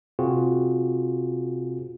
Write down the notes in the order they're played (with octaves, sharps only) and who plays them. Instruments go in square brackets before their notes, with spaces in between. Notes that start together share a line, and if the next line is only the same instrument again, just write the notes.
[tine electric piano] C3 C4 F4 F#4 G#4